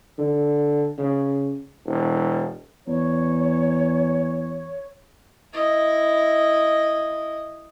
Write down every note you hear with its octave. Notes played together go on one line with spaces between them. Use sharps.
D3
C#3
E1
E2 C#5
E4 D#5